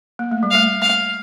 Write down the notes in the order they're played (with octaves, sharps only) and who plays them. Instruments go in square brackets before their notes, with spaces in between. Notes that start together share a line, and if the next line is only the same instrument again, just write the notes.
[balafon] A#3
A3
G3
[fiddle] F5
[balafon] A3
[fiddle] F5